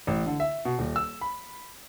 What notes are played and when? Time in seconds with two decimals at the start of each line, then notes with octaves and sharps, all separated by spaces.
0.07 A1
0.26 D3
0.40 E5
0.65 B2
0.79 D#1
0.96 E6
1.21 B5